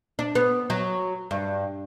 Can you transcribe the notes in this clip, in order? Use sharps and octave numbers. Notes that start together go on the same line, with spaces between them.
D4
B3
F#3
G2